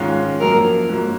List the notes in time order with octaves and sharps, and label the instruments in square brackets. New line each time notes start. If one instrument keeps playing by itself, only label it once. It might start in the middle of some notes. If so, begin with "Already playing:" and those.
Already playing: [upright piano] G#2 D#3 G#3 C#4 F4
[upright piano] F#2 F3 A#3 [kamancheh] A#4
[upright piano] G#2 F#3 A#3